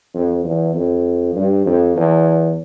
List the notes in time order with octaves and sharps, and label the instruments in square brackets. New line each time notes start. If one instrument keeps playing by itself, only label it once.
[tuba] F2
E2
F2
G2
F2
E2